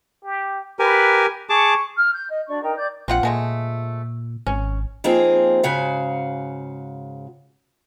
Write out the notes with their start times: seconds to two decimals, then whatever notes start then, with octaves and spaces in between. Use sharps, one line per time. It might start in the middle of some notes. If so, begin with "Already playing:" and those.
0.24 G4
0.79 G4 A#4 B4 G#5
1.49 G#4 A5 C#6 D6
1.96 F6
2.14 G6
2.29 D#5
2.48 D4 F#4 D5 C#6
2.62 D#4 A#4 G5 A#5
2.76 D5 D6 G6
3.08 A#1 C4 F4 F#5
3.23 A#2 F3 G#3 A3
4.47 G#1 C#4
5.04 F3 A#3 C4 D#4 G#4
5.63 G#2 C#3 F#4 F5